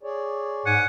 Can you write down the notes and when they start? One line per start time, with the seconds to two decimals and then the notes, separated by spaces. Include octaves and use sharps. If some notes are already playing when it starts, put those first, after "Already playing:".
0.03 G#4 C#5 D5
0.66 G#2 F#5 G#5